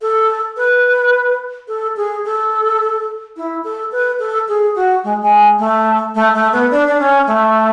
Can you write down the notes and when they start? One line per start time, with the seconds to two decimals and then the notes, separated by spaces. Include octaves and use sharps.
0.02 A4
0.57 B4
1.68 A4
1.97 G#4
2.25 A4
3.37 E4
3.64 A4
3.92 B4
4.19 A4
4.48 G#4
4.76 F#4
5.04 G#3
5.22 G#3
5.59 A3
6.15 A3
6.34 A3
6.53 B3
6.71 D4
6.87 D4
6.99 C#4
7.27 A3